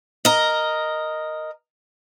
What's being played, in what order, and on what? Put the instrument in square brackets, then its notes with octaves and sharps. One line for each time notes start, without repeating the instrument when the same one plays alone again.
[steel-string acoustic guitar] A#4 D#5